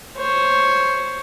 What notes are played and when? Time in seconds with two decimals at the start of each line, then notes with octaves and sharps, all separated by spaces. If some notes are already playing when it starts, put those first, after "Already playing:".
0.17 C5 C#5